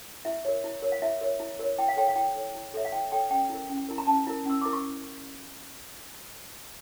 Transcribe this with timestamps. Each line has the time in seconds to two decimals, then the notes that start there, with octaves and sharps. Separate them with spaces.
0.25 E4 E5
0.45 A#4 C#5
0.64 E4
0.82 A#4 C#5
0.92 F5
1.02 E4 E5
1.21 A#4 C#5
1.40 E4
1.60 A#4 C#5
1.79 E4 G5
1.88 F5
1.97 A4 C#5 G5
2.08 F5
2.16 E4 G5
2.35 A4 C#5
2.55 E4
2.74 A4 C#5 E5
2.85 F5
2.92 E4 G5
3.12 A4 C#5 G5
3.30 C#4 G5
3.50 E4 A#4
3.70 C#4
3.89 E4 A#4
3.98 A#5
4.07 C#4 A5
4.27 E4 A#4
4.46 C#4 E6
4.61 E4 A#4 D6
4.73 C#6